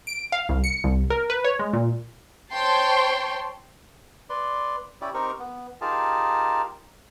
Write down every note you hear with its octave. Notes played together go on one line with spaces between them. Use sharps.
D7
F5
C2
C#7
C2
A#4
B4
C#5
G#3
A#2
C5 C#5 G5 A5 C6
B4 D5 C6
C#4 E4 G4 D5
C4 D#4 G4 A#4 C#6
B3
D#4 F4 G4 G#4 A#4 A5